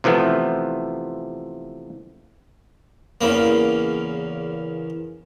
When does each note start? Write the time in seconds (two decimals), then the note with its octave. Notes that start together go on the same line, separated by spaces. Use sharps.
0.04 C3 E3 F3 A3 B3
3.21 E2 C#3 A#3